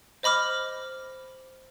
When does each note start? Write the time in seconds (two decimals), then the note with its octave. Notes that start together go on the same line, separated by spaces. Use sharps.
0.23 C5 D#5 B5 D6 F6